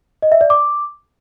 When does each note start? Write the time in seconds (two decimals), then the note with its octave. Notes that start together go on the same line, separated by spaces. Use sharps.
0.22 D#5
0.32 E5
0.41 D5
0.50 D6